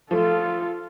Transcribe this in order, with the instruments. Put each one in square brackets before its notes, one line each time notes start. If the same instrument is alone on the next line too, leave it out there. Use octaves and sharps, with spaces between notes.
[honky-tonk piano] F3 A3 [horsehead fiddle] F4 A4